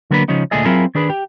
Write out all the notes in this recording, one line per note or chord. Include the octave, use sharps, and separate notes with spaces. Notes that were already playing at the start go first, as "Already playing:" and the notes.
D3 F#3 A#3 B3 D4 B4
C#3 F3 G#3 C#4 D#4
D2 A#2 A3 D4 G#4 D#5
F#3 C4 E4 F4 G#4 A#4
D#3 D4 G#4 B4
G4